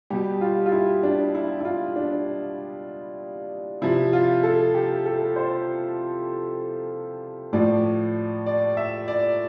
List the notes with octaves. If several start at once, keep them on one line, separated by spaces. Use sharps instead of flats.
B2 G3 G4
F4
F4
E4
D4
E4
E4
F4
D4
C3 F3 E4
F4
A4
G4
A4
C5
A2 F3 D5
D5
E5
D5